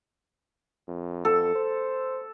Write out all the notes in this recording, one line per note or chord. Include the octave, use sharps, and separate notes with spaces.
F2
A4
C5